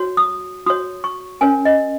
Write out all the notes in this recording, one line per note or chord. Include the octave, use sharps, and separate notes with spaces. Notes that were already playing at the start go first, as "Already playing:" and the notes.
Already playing: F#4 C#5
D#6
F#4 C#5 D#6
C#6
C#4 A#4 C#5 G#5
D#5